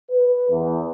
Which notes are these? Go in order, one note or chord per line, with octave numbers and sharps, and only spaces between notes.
B4
E2